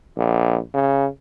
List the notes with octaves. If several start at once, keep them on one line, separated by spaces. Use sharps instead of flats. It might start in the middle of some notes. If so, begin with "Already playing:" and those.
A#1
C#3